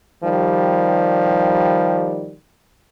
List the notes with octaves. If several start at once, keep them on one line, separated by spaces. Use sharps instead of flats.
D#3 F3 G3